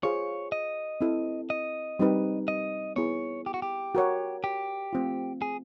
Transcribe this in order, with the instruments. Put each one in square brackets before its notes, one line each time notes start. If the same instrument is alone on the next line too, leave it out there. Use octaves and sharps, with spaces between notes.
[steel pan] F4 G#4 C5 F5 [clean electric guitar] C#5
[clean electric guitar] D#5
[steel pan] C4 E4 A4
[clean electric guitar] D#5
[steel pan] G3 C4 D#4 G4 B4
[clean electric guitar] D#5
[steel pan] B3 E4 G#4 [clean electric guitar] C#5
[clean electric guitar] G4
F#4
G4
[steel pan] F#4 A#4 C#5 F#5
[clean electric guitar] G4
[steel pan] A3 C4 F4
[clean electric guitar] G#4